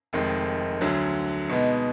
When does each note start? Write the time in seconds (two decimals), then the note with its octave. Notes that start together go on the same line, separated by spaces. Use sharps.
0.13 F1 F2 D#3 G#3
0.81 D2 D3 F#3
1.49 B2 G#3 B3 D#4